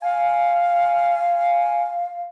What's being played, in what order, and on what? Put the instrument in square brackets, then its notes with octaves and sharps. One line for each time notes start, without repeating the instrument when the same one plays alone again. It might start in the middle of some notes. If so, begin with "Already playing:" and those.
[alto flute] F5 [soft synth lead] G#5